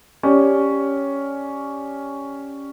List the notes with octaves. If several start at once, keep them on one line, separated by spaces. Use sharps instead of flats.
C#4 G4 D5